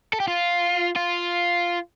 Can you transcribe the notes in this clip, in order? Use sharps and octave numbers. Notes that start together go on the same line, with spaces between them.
A4
G4
F4
F4